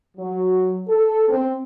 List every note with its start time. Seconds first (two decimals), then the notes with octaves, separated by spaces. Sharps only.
0.17 F#3
0.88 A4
1.29 C4